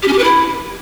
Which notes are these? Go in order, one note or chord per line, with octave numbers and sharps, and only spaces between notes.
G4
C#4
G4
B4
E4